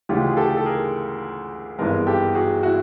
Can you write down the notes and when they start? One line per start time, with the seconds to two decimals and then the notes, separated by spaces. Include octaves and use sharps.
0.09 D2 C#3 E3 G#3 F4 G4
0.29 G#4
0.37 G4 A4
0.57 A4
0.66 G#4 A#4
1.79 G#1 G2 E3 G#3 B3 G#4 A#4
2.07 G4 A4
2.35 F#4 G#4
2.63 E4 F#4